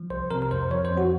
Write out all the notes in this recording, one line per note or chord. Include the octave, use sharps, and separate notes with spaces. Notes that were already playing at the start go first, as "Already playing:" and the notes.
Already playing: F3
C2 C5
C3 A#4
A#4
F2 C5
F3 C#5
C5
F2
F#4